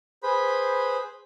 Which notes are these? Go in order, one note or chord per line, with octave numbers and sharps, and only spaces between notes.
G#4 B4 C5 B5